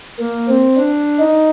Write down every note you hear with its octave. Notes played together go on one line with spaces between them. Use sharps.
A#3
C4
D4
D#4